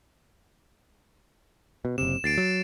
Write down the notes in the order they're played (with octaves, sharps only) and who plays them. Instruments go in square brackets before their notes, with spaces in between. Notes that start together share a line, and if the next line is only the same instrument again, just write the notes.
[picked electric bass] B2
[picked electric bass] F#1 C3 [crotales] E7
[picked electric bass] D2 [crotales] A6 C7 D7
[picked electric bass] F#3